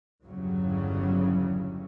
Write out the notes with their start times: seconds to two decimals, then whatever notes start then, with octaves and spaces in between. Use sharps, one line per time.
0.24 G1 E2 C#3 F#3 G3